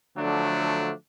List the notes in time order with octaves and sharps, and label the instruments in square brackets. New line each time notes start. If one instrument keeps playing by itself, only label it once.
[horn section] D3 F3 F#3 A3 D4